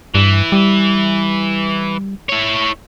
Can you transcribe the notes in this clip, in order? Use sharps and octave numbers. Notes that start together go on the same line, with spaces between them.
G2 E3
G3
E4 C#5